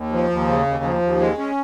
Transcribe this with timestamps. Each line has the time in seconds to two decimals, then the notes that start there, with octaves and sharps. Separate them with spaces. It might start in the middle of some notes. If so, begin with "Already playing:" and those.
Already playing: D#2
0.12 F3
0.30 D#2
0.48 C#3
0.66 D#2
0.84 F3
1.02 D#2
1.20 G#3
1.38 C#4